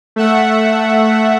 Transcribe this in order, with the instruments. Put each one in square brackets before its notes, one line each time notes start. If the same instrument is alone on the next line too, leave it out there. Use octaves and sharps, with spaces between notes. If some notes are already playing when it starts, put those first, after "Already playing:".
[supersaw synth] A3 E5 F#5